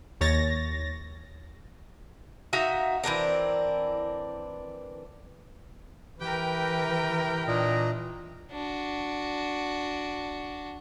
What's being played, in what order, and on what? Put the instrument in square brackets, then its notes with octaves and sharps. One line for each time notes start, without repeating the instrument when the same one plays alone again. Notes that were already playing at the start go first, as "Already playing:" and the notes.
[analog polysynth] D#2 C#5 A6 A#6
[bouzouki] D#4 F#4 E5 F5
E3 C4 D4 A#4
[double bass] E3 [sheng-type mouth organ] G4 B4 G6 [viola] A#4 G5
[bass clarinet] A#2 [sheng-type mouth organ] D4 D#5 A#5
[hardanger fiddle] D4 F#4